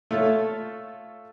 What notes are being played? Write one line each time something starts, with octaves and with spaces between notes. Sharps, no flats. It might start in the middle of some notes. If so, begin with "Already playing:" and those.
A3 F4 A4 C#5